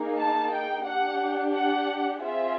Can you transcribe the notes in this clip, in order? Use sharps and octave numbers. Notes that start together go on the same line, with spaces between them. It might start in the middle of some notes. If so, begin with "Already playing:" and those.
Already playing: A#3 D#4 G#4
A5
G5
D4 G4 F#5
F#5
C4 F4 G#4 E5